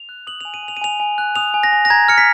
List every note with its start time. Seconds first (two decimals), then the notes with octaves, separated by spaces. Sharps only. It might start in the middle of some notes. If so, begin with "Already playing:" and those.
Already playing: F7
0.09 F#6
0.27 D#6 F#7
0.41 G#5 F7
0.54 D#7
0.63 G#5
0.68 F7
0.77 D#7
0.81 G#5 F7
1.00 G#5
1.18 F#6
1.36 D#6 F7
1.54 G#5
1.63 A#6
1.72 G#5
1.85 A#6
1.90 A#5 G#6
2.08 F6 C#7
2.18 B6